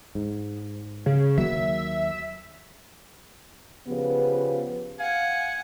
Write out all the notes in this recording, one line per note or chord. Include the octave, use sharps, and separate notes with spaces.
G#2
C#3
D#2 F#3 A#3 E5
C#3 F3 B3 G4 B4
F5 F#5 G#5